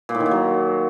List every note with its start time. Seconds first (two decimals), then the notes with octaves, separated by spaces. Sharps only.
0.09 A#2
0.15 A2
0.20 D#3
0.26 A#2
0.31 F#3